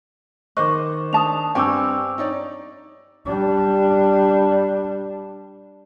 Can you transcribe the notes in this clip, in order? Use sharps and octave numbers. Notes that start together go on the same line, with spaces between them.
D#3 C5 D#5 C#6 D6 F#6
D4 A5 D#6 F7
G2 C4 G5 G#5 C#6 D6 E6
D#4 C#5 D5
G3 D4